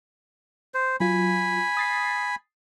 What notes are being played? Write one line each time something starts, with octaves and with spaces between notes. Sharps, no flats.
C5
F#3 F4 G#5 B5
D#6 A6 C7